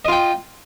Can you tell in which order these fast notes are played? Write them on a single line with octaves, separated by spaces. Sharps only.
D#5 F4 G5